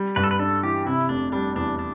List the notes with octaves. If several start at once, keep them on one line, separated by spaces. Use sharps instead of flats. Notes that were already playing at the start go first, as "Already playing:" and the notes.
Already playing: G3
G2 B4
A4
B4
D4 A4
E3 G4
C3 E4
F1 D4
G3 D4
E2 D4
D4